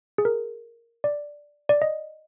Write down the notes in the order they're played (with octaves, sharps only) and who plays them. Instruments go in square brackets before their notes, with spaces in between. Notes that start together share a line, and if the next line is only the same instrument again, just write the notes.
[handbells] G#4
A#4
D5
D5
D#5